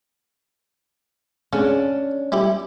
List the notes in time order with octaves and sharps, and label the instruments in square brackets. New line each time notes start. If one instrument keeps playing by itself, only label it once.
[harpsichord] C#3 [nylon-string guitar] C#4 D4
[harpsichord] G3 E4 G4